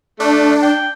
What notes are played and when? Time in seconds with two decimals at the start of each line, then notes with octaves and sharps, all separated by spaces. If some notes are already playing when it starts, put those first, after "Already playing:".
0.20 A3 D4
0.62 G5